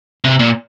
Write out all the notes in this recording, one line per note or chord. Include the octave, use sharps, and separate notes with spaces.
C3
A#2